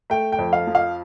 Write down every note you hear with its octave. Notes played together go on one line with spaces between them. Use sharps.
A3 G5
G5
F2
F5
F3
F5